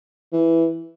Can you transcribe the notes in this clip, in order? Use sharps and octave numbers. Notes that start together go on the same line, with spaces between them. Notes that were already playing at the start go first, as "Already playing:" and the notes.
E3